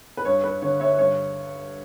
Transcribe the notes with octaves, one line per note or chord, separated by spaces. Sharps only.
B4
G2 C#5
B4
D3 C#5
C#5 E5
G2 C#5